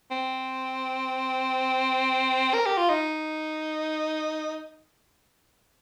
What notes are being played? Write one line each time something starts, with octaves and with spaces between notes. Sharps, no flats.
C4
A#4
G4
F4
D#4